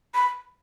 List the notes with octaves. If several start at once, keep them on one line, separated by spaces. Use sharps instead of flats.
B5